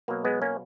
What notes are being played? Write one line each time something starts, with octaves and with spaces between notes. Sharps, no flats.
B2 F#3 A#3
G#3 B3
A#3 C#4